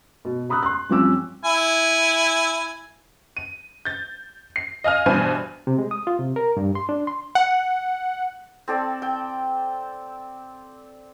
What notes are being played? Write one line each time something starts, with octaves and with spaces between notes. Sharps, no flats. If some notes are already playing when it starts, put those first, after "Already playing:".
B2
A#5 B5 D#6 E6 F#6
C6 F#6
G2 F3 C4 C#4 D6 E6
E4 G#5
D#7
G6 A6
C7
D#5 F5 G#5 F6
G2 B2 E3 B4 C5 G#5
C3
G#3
D#6
F4
C3
A#4
G2
C6
D4
C6
F#5
C4 A4 D5
G5